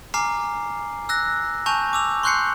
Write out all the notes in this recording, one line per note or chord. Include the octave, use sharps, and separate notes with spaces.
G#5 A#5 D6 F6 C7
E6 F#6 A#6
G#5 A5 C#6 G6 F7
D6 E6 F7
C6 C#6 F#6 G6 C7 C#7